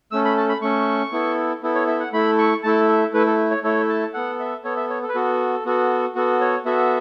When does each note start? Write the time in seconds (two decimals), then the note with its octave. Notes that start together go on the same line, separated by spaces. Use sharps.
0.11 A3 C#4 A4 E6
0.25 B5
0.37 A5
0.49 B5
0.62 A3 C#4 A4 C#6
1.12 B3 E4 A4
1.62 B3 E4 A4
1.75 C#5
1.87 E5
2.00 F#5
2.13 A3 E4 A4 B5
2.38 C#6
2.63 A3 E4 A4 A5
2.89 E5
3.13 A3 E4 A4 B4
3.27 A4
3.51 C#5
3.63 A3 E4 A4 C#5
3.89 A5
4.14 B3 A4 F#5
4.40 E5
4.64 B3 A4 C#5
4.76 E5
4.90 C#5
5.02 A4
5.09 B4
5.15 B3 F#4 A4
5.65 B3 F#4 A4
6.16 B3 F#4 A4
6.41 C#5
6.65 B3 F#4 A4 E5